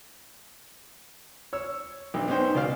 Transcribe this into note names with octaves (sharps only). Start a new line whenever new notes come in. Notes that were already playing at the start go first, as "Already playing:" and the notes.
C#5 E6
B1 D4
B3 C#4 D#4 C5 G5
C#2 B2 D5 F5